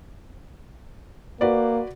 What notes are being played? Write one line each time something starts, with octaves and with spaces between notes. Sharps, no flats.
A#3 F#4 B4 D5